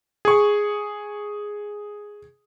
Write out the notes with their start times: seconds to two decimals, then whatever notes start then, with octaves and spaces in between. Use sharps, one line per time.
0.25 G#4 C#6